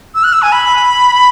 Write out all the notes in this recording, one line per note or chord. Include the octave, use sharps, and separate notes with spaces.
E6
F#6
E6
G#5
B5